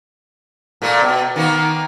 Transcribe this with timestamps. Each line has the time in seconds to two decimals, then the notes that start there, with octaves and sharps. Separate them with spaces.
0.82 A#2 A3 A#3
1.02 B2
1.36 D#3 A#3 B3